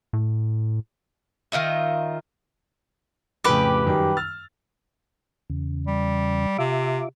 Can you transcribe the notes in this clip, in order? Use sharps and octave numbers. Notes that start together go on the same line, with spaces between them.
A2
D#3 F4 D#5 E5
F2 A2 C#3 G4 B4
F#2 D#3 G3
E6 F6 A6
E2 C#3
G3
C3 F4 E5 D6